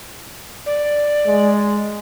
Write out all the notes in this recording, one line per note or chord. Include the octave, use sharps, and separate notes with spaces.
D5
G#3